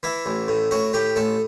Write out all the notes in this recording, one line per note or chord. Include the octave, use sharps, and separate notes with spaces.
E3 E4
A1
A2
A2 F#4
A2 G4
A1 A4